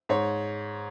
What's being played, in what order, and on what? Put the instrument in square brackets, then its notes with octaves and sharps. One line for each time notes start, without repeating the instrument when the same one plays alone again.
[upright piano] G#2 C#5